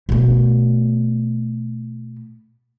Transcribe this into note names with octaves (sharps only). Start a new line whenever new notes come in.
B2 A3